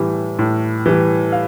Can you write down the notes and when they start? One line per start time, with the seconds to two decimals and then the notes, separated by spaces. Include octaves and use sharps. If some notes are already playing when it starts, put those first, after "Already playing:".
Already playing: A2 E3 G3
0.39 A2
0.86 E3 G3
1.32 F5